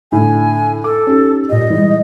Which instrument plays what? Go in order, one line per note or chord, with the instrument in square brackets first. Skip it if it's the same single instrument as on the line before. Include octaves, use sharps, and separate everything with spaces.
[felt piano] A2 D3 [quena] G#5
[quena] A4 [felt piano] D6
[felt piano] C#4 D#4 G4
[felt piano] A#2 G4 [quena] D#5
[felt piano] E3 G3 G#3